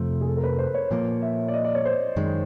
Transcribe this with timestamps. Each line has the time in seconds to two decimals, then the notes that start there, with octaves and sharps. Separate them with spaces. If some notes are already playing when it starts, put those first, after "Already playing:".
Already playing: F2 C3 F3 A3 A4
0.21 G#4
0.27 A4
0.37 A#4
0.44 B4
0.58 C5
0.74 C#5
0.91 A#2 F3 A#3
1.22 E5
1.48 D5
1.54 D#5
1.64 D5
1.75 C#5
1.85 C5
2.16 F#2 D#3 G#3